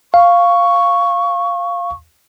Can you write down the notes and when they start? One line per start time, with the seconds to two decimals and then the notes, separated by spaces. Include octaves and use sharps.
0.14 F5 C#6